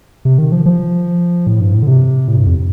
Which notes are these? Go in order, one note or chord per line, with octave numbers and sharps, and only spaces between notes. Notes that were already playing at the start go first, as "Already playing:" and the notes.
C3
D#3
F3
F3
A2
G2
A2
D3
C3
A2
G2
F2